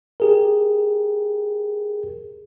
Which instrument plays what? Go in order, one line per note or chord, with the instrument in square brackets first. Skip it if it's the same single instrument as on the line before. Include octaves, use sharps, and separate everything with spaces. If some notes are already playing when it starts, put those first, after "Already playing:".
[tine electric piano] G4 G#4 A#4